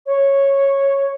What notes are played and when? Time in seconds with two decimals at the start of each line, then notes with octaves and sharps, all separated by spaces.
0.06 C#5